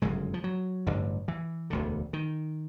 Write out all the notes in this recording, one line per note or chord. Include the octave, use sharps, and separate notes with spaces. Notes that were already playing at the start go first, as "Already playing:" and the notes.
G1 F#2 C#3 G#3
F3
F#3
A1 G2 D3
E3
E1 D2 D3
D#3